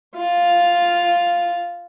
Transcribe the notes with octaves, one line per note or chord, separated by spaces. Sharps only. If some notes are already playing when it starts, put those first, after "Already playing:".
F4 F5